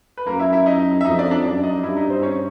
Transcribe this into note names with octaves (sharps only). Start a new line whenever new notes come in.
B4
F#2 A#3 A#4
E4 E5
E4 E5
D#4 D#5
E5
F2 D#4 D#5
D4 D5
D4 D5
F#2 D4 D5
D#4 D#5
G2 E4 E5
D#4 D#5
C4 C5
C#4 C#5